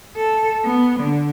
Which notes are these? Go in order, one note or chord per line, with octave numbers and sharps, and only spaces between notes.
A4
B3
D3